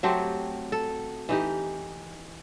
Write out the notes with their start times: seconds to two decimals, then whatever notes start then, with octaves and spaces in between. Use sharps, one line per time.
0.03 F#3 A3 C4 G4
0.72 A4
1.29 E3 D#4 G4